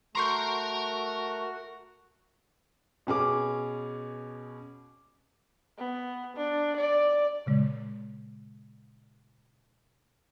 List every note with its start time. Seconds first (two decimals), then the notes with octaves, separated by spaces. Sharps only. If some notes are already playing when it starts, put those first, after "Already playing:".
0.15 A3 F#4 A#4 A#5 C6 C#6 G6
3.07 B2 C#4 G#4 D6
5.78 B3
6.36 D4
6.77 D5
7.46 A#2 C#3 G#3